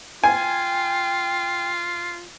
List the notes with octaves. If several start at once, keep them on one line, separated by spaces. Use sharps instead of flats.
F4 G5 G#5